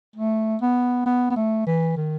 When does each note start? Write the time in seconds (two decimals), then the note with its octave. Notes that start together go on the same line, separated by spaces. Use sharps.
0.16 A3
0.62 B3
1.06 B3
1.30 B3
1.36 A3
1.67 E3
1.97 D#3